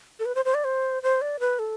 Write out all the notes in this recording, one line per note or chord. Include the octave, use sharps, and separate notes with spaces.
A4
B4
C5
C5
D5
C5
C5
D5
B4
A4